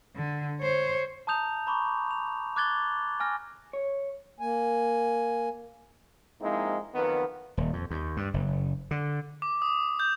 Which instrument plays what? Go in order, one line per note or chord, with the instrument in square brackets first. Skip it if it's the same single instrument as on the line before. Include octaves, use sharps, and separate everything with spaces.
[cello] D3
C5 C#5
[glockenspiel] A5 A#5 D#6 G6 F7
A#5 B5 C#6 D6
F7
D6 F#6 G#6 A6 G7
G#5 F6 A#6
[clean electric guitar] C#5
[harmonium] A#3 G#5
[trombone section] F3 G#3 A#3 C4 D#4 E4
F2 D#3 F#3 B3
[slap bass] D#1
F2
D#2
G2
F#1
D3
[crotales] D6
D#6
G6